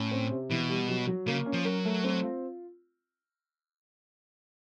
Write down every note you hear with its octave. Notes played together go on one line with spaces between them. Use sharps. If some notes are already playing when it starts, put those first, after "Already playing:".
Already playing: A2 C#4
C4
C3
B2 E3
G3
F#3
F#3
C#3 A#3
C#4
F3
F#3 A#4
A3
C4
F4